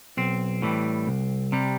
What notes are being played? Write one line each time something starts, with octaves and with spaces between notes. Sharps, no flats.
B1 C4
A2 E3 G3
C2
C3 G3